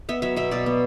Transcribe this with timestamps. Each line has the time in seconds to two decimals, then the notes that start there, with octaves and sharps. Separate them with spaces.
0.09 B3 E5
0.22 F#3 E5
0.36 B2 E5
0.51 B2 D5
0.66 B3